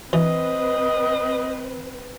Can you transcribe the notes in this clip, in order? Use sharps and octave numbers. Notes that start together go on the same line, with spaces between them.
E3 C4 B4 C5 D#5